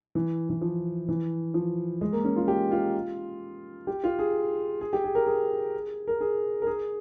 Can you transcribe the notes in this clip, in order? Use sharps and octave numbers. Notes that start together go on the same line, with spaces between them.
E3
E3
F3
E3
F3
G#3
A#3
C#4
F4
G4
F4
G4
F4
G#4
G#4
G4
G#4
A#4
G#4
A#4
G#4
A#4
G#4